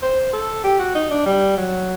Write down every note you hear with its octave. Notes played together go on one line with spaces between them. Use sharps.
C5
A4
G4
F#4
D#4
D4
G3
F#3